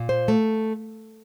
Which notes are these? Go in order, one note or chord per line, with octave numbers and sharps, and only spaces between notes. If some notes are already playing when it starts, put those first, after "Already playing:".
Already playing: A#2
C5
A3